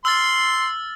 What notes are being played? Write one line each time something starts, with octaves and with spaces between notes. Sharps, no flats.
C6 E6 F6 A6